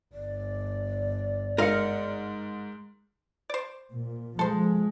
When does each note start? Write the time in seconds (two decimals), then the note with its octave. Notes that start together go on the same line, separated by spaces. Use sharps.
0.13 G1 D5
1.58 G#2 A#4 D#5 F5 F6 C#7
3.50 C5 D5
3.92 A#2
4.39 F3 G#3 A4 C5